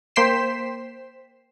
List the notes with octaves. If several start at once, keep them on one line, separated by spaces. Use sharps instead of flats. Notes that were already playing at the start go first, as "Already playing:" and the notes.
A#3 C5 G5 B6 C7 E7